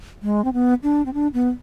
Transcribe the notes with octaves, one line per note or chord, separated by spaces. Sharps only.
G#3
C4
B3
D4
C4
D4
B3